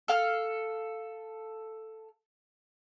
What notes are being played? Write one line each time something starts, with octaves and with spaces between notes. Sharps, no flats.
A4 F5 F6